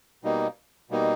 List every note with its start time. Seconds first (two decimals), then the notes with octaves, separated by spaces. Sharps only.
0.24 B2 G3 A#3 D#4
0.90 B2 G3 A#3 D#4